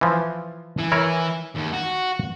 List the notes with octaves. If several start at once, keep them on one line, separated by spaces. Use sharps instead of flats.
E3 F3
E3
E4 A#4 C#5
D#2
F#4